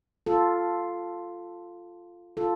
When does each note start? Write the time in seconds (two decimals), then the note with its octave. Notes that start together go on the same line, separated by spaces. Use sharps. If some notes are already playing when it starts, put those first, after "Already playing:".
0.26 F4 A4
2.37 F4 A4